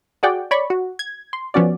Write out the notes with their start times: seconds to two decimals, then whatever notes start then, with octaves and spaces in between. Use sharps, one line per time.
0.23 F#4 G#4 D5 F#5 G5
0.51 C#5 D5 B5 C#6
0.70 F#4
0.99 G#6
1.33 C6
1.54 F3 B3 C#4 F#4 D5